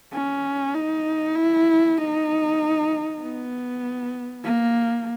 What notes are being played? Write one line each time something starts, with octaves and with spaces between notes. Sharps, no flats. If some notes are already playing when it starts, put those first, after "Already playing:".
C#4
D#4
E4
D#4
B3
A#3